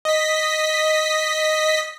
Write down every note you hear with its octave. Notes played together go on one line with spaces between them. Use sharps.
D#5 B6